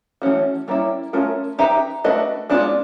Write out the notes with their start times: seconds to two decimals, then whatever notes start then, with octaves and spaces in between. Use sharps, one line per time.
0.22 E3 A3 C#4 F#4
0.68 G3 A#3 C#4 E4
1.13 A3 C#4 F4 A#4
1.58 D#4 G4 B4 E5
2.04 A3 D4 F#4 B4 D#5
2.50 G#3 B3 D4 F4